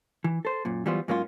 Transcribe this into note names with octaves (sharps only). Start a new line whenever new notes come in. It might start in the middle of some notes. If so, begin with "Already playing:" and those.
E3
A4 C5
F#2 A#2
E3 F#3 G3 B3 F4 C5
G#2 F#3 A#3 C#4 E4 F4